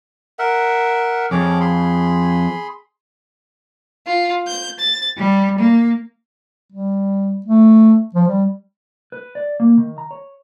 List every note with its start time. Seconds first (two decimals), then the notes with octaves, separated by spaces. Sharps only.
0.39 A#4 E5 F#5
1.31 F2 G#4 C#5 D6
1.61 G#4 B5 C6
4.06 F4
4.46 G6
4.78 A6
5.18 G3
5.59 A#3
6.72 G3
7.46 A3
8.14 F3
8.28 G3
9.12 B4
9.35 D5
9.60 A#3
9.78 D#3
9.98 A#5
10.11 C#5